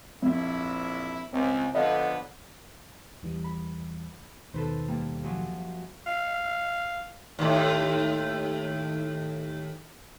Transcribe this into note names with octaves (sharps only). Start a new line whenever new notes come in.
A#1 F2 E4
C#2 C4
D3 F3 B3 A4 D#5 F5
E2 E3 G3
B5
D#2 B2 D#3 A4 B4 C5
G3 A#3
F#2 F3 F#3
F5
D#2 A2